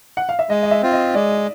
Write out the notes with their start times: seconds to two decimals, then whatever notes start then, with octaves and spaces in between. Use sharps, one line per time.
0.17 F#5
0.29 F5
0.39 E5
0.49 G#3 D#5
0.63 D#5
0.71 E5
0.82 C4 F4
0.93 D#5
1.14 G#3 D5